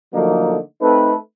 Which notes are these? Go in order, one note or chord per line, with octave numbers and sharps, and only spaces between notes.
D3 F3 F#3 A3 A#3 D#4
A3 C4 D#4 A4 B4